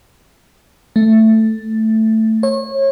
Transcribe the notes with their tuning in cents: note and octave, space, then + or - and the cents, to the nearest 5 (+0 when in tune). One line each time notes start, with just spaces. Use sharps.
A3 +5
C#5 -30